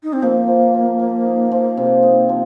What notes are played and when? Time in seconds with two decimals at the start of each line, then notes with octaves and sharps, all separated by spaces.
0.03 D#4
0.12 C4
0.22 F3 A#3
0.48 F3
0.74 F3
1.00 F3
1.26 D#4
1.51 F3
1.77 C3
2.03 D#4
2.29 F3